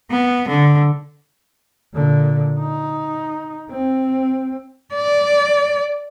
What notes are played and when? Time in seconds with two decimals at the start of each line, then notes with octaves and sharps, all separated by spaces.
0.11 B3
0.48 D3
1.94 A#2 D3
2.60 D#4
3.70 C4
4.94 D5